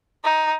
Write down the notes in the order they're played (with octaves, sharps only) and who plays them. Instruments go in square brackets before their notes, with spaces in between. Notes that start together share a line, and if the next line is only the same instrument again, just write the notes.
[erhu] D#4